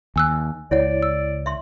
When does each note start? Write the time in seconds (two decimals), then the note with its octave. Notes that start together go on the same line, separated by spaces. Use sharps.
0.16 D#2 G#5 E6 F#6
0.71 C#2 E4 C#5 D5 F#5
1.03 E6
1.46 E5 C6